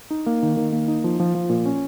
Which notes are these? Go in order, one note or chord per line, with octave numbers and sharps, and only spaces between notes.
D#4
A#3
D#3
D#3
A#3
D#4
F3
F3
F3
A#2
C#4